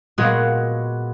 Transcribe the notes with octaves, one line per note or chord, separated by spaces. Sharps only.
A#2 G#3 B3 F4 F#4 G#4